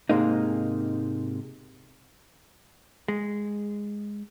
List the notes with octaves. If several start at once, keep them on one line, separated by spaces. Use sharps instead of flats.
G#2 C3 G#3 A#3 D#4
G#3